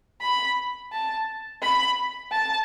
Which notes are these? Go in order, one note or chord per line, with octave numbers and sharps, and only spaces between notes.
B5
A5
B5
A5